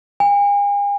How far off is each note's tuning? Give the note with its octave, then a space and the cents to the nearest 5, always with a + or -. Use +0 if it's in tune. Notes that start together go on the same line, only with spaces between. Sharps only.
G#5 -45